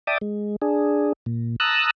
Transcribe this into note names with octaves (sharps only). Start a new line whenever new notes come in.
D5 E5 G5 A5 D6 D#6
G#3
D4 G#4
A#2
A5 A#5 D#6 E6 F#6